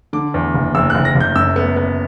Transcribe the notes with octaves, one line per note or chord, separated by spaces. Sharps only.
D3 D6
E2
F#1
F#1 E6
F#1 F#6
A#6
F#1
G6
F#2 E6
B3
B3